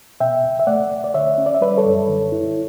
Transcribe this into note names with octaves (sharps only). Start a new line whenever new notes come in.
B2 E5 G5
C#2
E5
A3 D5 F#5
C#2
D5
D3 C#5 E5
C#4
D5
E5
G3 B4 D5
A4 C#5
F#2
D3
E4